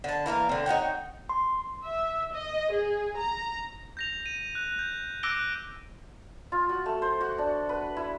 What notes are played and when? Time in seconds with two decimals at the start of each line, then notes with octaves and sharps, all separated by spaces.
0.04 D3 A5
0.26 E3 A#3 A#4 F5
0.49 D3 C4
0.66 D#4 F#4 C#5 G5
1.29 C6
1.84 E5
2.33 D#5
2.72 G#4
3.18 A#5
3.97 G6 A#6 F7
4.26 D#7
4.55 F#6
4.79 G6
5.23 D6 E6 F#6 A#6 D7 G7
6.52 F4
6.69 F#4
6.86 A3
7.02 C5
7.21 F#4
7.38 D4
7.69 B4
7.97 E4